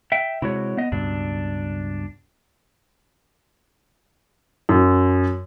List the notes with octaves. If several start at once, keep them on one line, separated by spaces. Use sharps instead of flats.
E5 G5
C3 G#3 E4 F#4 C#5
B3 D#5
C#2 G2 B2 D4
F#2